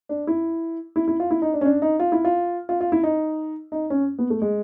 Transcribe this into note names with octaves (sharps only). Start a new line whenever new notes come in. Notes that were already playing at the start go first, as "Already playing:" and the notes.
D4
E4
E4
E4
F4
E4
D#4
D4
C#4
D4
D#4
F4
E4
F4
F4
F4
E4
D#4
D#4
C#4
B3
A3
G#3